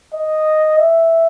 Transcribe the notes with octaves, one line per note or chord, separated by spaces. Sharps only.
D#5
E5